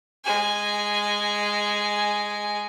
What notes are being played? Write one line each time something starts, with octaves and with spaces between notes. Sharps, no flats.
G#3 G#5